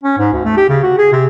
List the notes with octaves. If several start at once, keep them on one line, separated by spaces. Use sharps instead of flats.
C#4
G#2
D2
A3
G4
C#3
F#4
G#4
C3